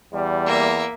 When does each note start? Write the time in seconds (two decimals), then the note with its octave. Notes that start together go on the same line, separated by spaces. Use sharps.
0.13 E2 G3
0.46 A#3 E5